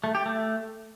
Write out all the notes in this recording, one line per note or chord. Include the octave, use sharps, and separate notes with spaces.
A3
G4
A3